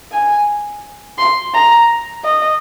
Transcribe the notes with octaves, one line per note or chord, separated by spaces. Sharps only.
G#5
C6
A#5
D#5